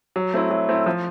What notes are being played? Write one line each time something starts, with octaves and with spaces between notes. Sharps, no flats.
F#3
A3 C4 E4
F#3
A3 C4 E4
F3